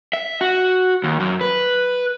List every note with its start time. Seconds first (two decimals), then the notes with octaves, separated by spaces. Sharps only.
0.13 E5
0.41 F#4
1.04 D#2
1.20 F#2
1.41 B4